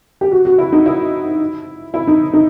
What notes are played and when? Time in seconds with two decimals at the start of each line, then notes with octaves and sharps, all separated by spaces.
0.21 G4
0.31 F#4
0.45 F#4
0.58 E4
0.72 D#4
0.86 E4
1.94 E4
2.07 D#4
2.33 D#4